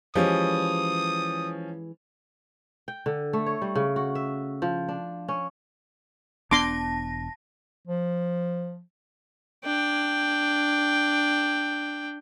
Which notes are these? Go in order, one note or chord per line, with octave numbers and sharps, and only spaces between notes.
E3 F3 G#3 C#4 G4 D#6
G5
D3
A3
C#5
G3
C#3
F#4
E5
F3
D4
C#4
E1 B3 D4 A5 C6 D6 A#6
F3
D4 G5